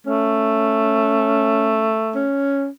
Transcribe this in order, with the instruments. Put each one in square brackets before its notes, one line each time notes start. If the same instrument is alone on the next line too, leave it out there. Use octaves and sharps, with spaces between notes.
[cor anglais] A3 [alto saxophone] C#4
[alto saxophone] C#4